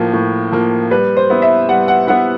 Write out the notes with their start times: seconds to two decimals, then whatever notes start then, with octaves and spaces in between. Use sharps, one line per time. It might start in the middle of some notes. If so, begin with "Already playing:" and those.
Already playing: A2 F3 A#3
0.13 A2
0.52 F3 A#3
0.90 G3 B4
1.17 C5
1.30 B3 E4
1.42 E5
1.69 G3 F#5
1.88 F#5
2.07 B3 E4 F#5